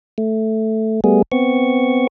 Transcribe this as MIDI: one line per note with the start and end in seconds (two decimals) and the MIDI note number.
0.18 1.01 57
1.04 1.22 55
1.04 1.22 57
1.04 1.22 59
1.04 1.22 68
1.32 2.07 59
1.32 2.07 60
1.32 2.07 85